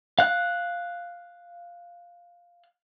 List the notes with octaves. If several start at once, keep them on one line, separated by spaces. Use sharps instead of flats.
F5 F#6